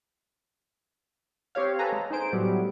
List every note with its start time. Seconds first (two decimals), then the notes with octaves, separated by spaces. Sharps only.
1.55 C4 G4 C#5 F5
1.79 A4 B4 G#5 A#5
1.92 G#3
2.10 D#4 G#4 C5 D7
2.32 A2 F#3 G3 B3